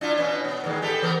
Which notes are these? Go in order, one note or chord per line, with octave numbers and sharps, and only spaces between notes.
D4 E4 F4
B2 B3 C#4
B3
A2 D#3 G#3
B3 G4 A4
E3 B3 A#4